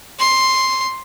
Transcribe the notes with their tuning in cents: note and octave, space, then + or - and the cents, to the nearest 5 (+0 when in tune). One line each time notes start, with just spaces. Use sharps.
C6 +5